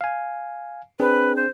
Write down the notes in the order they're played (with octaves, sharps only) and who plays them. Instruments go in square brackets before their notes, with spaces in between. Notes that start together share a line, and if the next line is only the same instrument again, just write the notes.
[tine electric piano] F5 G#5
[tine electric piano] C4 D4 G#4 [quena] B4
[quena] C5